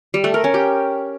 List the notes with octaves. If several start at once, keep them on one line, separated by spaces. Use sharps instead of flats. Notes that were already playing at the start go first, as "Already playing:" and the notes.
G3
A3
A#4
C#4
G4